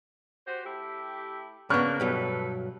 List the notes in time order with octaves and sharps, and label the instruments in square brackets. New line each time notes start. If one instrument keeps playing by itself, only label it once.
[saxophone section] F#4 G4 C5
A3 E4 G4
[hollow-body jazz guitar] C#3 B3 [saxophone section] A#3 D4 [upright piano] C#6 F6 F#6
[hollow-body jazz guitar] G2 B2 F#3 [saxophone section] A3 A4 B4